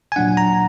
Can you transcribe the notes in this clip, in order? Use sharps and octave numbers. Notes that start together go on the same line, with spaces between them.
G#5
A#2 F#3 D4 F#5
A#5